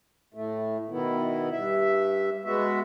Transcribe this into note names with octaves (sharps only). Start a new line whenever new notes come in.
A2 A3
B2 D#3 B3 E4
G2 E5
G#3 B3 F#4 E5